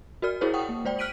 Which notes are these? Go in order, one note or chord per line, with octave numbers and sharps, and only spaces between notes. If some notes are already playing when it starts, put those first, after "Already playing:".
F#4 A#4 D5 F6
E4 F#4 G#4 A#4 C5 C#5
F#5 G5 C#6 D#6
A#3
G#3 C5 D5 G5
F6 F#6 B6 D7 D#7 F#7